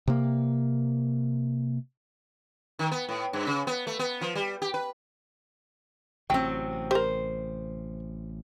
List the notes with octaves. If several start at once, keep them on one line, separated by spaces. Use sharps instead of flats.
C3 A#3
D#3
B3
A2
G2
C#3
B3
A3
B3
F3
G3
G4
B4
A1 C3 F#3 C4 G5
G4 A#4 C5